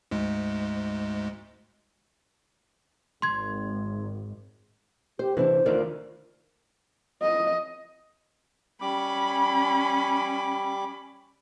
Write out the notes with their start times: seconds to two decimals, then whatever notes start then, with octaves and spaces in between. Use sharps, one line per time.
0.11 D2 G#2 G#3
3.22 G#1 C6 G#6
5.19 G4 C5
5.37 C3 E3 D4 E4 B4 C5
5.66 D2 D#3 F4 A#4 D5
7.22 D#5
8.81 G3 C#4 B5 D6